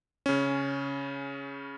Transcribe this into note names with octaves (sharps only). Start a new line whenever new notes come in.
C#3 C#4